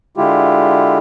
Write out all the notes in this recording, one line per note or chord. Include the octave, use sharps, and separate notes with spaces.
D3 G#3 E4 F4 G4